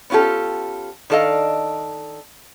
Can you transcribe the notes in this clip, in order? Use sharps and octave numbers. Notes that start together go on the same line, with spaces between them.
B3 C#4 F4 G4 A4
D#3 D4 A4 D#5 F5